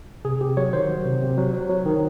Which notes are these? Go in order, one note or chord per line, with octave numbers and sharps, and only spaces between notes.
C3 G#4
C3 G4
F#3 C#5
D#3 C5
F#3
C3
C3
F#3
F#3
F#3
D#3